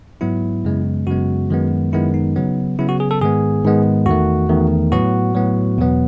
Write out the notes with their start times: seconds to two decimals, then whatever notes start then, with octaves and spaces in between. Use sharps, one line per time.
0.21 G#2 F#3 B3 E4
0.65 F#2 C#3 G#3 B3
1.07 F#2 C#3 G#3 B3 F#4
1.50 F#2 D#3 G#3 B3
1.92 F#2 D#3 G#3 B3 E4
2.14 D#4
2.36 C#3 F#3 B3
2.79 C#3 F#3 B3 E4
2.89 F#4
3.00 G#4
3.11 A4
3.21 G#2 D#3 G#3 B3 G#4
3.64 G#2 D#3 G#3 B3
4.06 E2 D#3 A3 F#4
4.49 E2 D#3 A3
4.92 A2 F#3 B3 F#4
5.35 A2 F#3 B3
5.78 E2 B2 F#3 B3